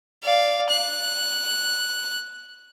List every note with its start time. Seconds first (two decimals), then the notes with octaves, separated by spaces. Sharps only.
0.23 D5 F5
0.69 F#6